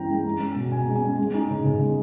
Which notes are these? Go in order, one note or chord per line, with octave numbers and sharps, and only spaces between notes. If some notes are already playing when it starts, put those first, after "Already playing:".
Already playing: G2 E3 C#4 G5 A#5
G#3
G#3
C#4
B2
B2 G#5
G#3
G#5
C#4
G#3
D#4
C#3
C#3
G#3